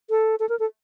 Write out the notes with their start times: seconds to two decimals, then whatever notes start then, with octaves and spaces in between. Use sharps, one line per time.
0.10 A4
0.40 A4
0.49 A#4
0.59 A4